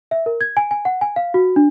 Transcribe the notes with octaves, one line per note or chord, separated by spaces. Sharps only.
E5
A#4
G#6
G#5
G#5
F#5
G#5
F5
F#4
D4